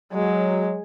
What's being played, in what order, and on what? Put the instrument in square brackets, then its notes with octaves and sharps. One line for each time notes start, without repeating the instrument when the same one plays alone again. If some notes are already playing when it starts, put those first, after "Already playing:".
[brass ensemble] F#3 [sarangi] G#3